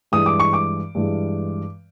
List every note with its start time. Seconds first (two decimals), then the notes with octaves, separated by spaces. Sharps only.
0.12 G2 E3 G#3 D#6
0.26 D6
0.40 C#6
0.53 D6
0.95 G2 E3 G#3